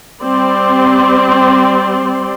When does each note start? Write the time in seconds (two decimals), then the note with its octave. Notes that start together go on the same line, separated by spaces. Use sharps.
0.23 G3 C4 D5 C6